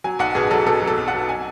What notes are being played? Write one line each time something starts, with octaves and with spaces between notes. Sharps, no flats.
F#3 G#5
B1 F#5
B2 G#4
F#3 A4
B2 A4
F#3
A4
B1
F#5
F#3
G#5